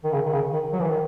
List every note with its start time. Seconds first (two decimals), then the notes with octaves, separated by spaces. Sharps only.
0.04 D#3
0.12 C#3
0.25 D#3
0.32 C#3
0.53 D#3
0.73 F#3
0.81 E3
0.90 D#3